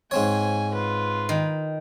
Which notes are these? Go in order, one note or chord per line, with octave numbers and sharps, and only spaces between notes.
G#2 C4 C#5 G#5
F4 B4
D#3